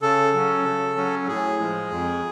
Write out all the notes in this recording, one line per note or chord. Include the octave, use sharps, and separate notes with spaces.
C#3 A4
F#3 C#4
C#3
F#3 C#4
A2 G#4
F3 G#3
F2